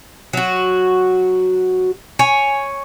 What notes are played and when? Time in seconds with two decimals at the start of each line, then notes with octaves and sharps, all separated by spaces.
0.33 F#3 F#4
2.19 C#5 G#5